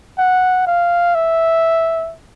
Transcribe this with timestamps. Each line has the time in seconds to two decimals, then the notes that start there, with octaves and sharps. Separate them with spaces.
0.18 F#5
0.67 F5
1.15 E5